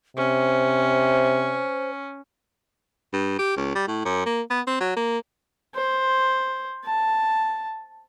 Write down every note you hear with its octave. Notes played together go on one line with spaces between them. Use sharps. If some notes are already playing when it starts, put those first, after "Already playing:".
C3 C#4 C5
G2
G4
C#2
G3
A2
F#2
A#3
B3
C4
F#3
A#3
C5
A5